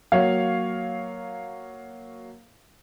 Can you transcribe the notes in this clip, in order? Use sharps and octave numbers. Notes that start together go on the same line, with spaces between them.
F#3 A#3 C#5 F5